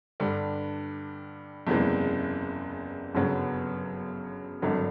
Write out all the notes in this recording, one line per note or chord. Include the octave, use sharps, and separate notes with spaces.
G2 D3 G3
F#1 E2 C3 E3 G#3
G1 F#2 C#3 F#3 B3
G#1 G2 D3 F#3